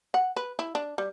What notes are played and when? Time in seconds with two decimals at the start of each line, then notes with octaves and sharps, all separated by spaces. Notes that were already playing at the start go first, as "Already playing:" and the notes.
0.14 F#5
0.36 B4
0.59 E4
0.75 D4
0.98 G3